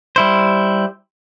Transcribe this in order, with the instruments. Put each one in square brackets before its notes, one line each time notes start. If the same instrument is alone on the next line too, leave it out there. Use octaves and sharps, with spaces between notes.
[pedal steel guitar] G3 E4 C5